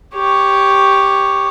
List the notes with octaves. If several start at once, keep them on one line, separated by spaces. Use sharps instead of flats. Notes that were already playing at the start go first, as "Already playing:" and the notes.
G4 C#5